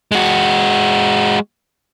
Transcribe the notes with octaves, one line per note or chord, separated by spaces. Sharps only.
G#3 F#4